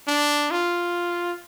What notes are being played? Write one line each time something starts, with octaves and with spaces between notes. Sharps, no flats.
D4
F4